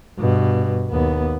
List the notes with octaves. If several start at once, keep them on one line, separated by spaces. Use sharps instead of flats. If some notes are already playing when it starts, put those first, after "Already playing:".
G2 B2
D#2 B3